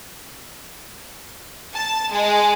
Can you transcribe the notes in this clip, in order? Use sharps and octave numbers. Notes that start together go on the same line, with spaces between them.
A5
G#3